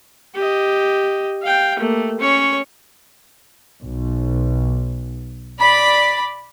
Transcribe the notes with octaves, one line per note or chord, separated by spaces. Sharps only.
G4 D#5
F5 G5
A3 A#3
C#4 C#5
B1
D5 B5